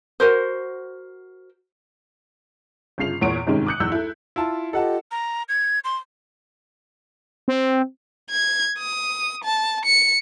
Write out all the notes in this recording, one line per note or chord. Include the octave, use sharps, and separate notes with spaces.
F#4 A#4 C5
G1 C#3 F4 C7 F7
E2 A#2 C#5 F#5 C#6 D7
G1 G#2 C3 D#3 G#3 C#4
D6 D#6 F#6 G6 C#7
B1 E2 E6 G6
E4 A4
E4 F4 A5
F4 G4 A4 D#5 F#5 A5
A#5
G#6
C6
C4
G#6
D#6
A5
C#7